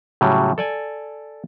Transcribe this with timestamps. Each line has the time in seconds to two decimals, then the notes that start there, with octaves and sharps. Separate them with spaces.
0.21 A2 C#3 F#3 G3
0.58 A4 D5 G#5